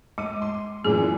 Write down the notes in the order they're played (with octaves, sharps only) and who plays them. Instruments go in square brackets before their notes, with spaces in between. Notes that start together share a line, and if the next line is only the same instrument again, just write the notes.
[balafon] G#3 [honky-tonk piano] D6 D#7
[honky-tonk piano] C6
[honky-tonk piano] F#2 A#2 E3 [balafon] G#4